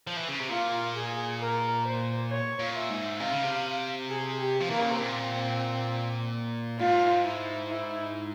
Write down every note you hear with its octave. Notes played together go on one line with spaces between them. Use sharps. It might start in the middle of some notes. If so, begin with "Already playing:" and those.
F3
E3
C#3
C3
A#2 F4
G#4
A#4
C5
C#5
A#2
E5
G#2
C3 F5
C#3
C3
G#4
G4
F3
E3 A#3
C#3
C3
A#2 C4
G#2 F4
E4
E4